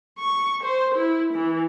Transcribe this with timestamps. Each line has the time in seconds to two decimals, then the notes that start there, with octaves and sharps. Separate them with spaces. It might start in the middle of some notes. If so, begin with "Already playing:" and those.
0.19 C#6
0.64 C5
0.95 E4
1.34 E3